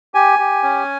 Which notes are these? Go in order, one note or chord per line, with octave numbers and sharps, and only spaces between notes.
G4 G#5
G4
C#4